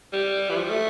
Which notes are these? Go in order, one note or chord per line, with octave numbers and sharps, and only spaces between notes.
G3
E3
F3
G3
A3